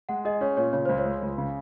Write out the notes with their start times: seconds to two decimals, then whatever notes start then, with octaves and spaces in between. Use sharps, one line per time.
0.09 G#3 F#5
0.25 G#4 D#5
0.41 C#4 C#5
0.57 A#2 C#5
0.73 C#3 C#5
0.85 C#2 C5
0.98 C#5
1.05 G#3
1.22 C#2
1.38 C#3